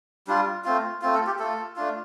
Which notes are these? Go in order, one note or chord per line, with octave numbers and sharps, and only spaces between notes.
G3 D4 F4
A3 C4 F4
A3 C4 F4
A4
G4
A3 F4 A4
A3 D4 F4